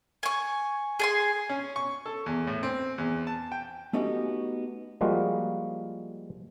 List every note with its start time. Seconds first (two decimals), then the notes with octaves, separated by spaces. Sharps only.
0.23 G#5 C#6
1.00 G#4 G#5 C6
1.49 C#4
1.76 C#6
2.06 A4
2.26 E2
2.47 A2
2.63 C4
2.98 E2
3.27 A5
3.52 G5
3.93 A3 B3 C#4 D#4 F#4 G4
5.01 F3 G3 G#3 A#3 F4 F#4